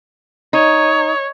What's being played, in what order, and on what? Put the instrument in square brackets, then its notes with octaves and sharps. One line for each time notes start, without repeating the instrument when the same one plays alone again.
[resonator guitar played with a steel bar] D#4 [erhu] C#5